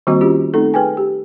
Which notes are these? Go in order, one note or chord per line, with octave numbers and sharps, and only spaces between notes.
D#3 G3 A#3 C4 F#4 D#5
C#4 F4 G4
A3 C4 D#4 A4
G#4 B4 G5 G#5
G4